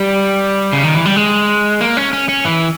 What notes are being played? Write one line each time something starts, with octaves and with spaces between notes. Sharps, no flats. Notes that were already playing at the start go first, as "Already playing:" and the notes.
Already playing: G3
C#3
D#3
E3
G3
G#3
A#3
C#4
C#4
C#4
E3